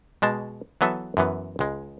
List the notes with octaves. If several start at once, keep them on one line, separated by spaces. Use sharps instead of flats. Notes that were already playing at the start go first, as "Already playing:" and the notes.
B2 G#3 A5
E3 F#3 B3 A4 E5
F#2 E3 B3
C#2 G#3